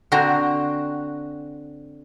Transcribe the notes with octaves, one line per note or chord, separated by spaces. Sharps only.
D3 C4 F#4 A#5